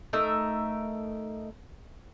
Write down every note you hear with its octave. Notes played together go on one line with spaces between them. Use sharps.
A3 D#4 A#4 E5